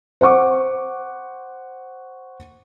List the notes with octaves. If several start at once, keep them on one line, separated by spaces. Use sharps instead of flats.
C5 F#5 C#6 D6